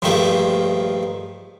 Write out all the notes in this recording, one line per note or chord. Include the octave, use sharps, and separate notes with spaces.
A#1 G2 D#3 F3 A3 F4